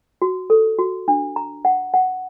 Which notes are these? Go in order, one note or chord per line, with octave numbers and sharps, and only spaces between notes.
F#4
A4
F#4
D4
A#5
F#5
F#5